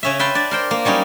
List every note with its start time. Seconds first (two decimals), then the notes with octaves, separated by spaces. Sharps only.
0.03 C#3 C#4 E5
0.19 B4 E5 G5 A5 C6
0.35 D4 D5
0.51 A#4 C5 G5
0.71 A#3
0.85 F#3 G3 C#4 D#4